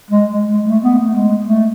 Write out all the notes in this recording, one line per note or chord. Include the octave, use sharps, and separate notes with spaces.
G#3
G#3
G#3
A3
B3
A3
G#3
A3